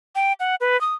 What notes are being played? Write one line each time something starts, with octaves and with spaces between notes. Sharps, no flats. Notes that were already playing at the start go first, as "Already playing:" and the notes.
G5
F#5
B4
D#6